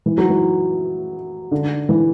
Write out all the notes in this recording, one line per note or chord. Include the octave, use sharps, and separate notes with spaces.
E3
F#3
E3
D3
E3